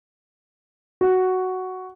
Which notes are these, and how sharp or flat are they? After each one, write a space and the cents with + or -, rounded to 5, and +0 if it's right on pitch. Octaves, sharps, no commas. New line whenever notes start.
F#4 +5